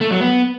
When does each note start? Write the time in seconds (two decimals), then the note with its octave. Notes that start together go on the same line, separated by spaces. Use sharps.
0.01 A3
0.11 F#3
0.21 B3